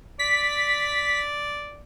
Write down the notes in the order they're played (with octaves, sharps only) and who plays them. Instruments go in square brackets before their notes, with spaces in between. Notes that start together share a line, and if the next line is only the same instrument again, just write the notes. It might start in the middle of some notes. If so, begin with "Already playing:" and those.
[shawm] D5 [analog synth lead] B6